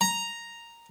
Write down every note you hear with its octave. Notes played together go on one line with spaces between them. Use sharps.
A#5